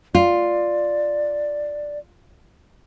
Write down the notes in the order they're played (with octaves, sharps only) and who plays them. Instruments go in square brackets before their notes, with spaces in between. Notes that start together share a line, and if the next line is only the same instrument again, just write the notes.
[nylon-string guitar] F4 [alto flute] D5